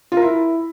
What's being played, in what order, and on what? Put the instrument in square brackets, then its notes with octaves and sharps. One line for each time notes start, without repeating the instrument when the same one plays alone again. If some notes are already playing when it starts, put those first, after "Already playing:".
[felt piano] F4
A#4
E4